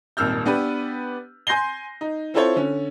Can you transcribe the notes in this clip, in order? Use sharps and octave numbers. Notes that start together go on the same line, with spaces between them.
D#1 G#1 A#3 E6 F6 G6
B3 D4 G4 B4
G#5 C6 G6 A#6 C7 G7
D#4
C4 E4 F4 A4 C5 C#5
D3 C#4